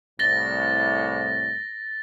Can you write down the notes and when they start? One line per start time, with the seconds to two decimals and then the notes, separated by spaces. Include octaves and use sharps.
0.19 C2 A2 A6 A#6 G7